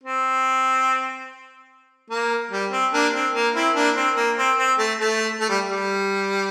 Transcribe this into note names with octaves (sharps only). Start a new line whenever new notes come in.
C4
A#3
G3
C4
A#3 D4
C4
A#3
C4 E4
A#3 D4
C4
A#3
C4
C4
A3
A3
A3
G3
G3